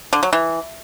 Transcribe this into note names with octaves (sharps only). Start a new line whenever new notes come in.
D3
F#3
E3